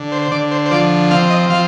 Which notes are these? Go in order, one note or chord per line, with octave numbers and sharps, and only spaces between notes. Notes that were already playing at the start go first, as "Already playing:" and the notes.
Already playing: D3
C5
C5
D3 D5
C5
C5
F3 D5
C4 F5
D#5
F3 F5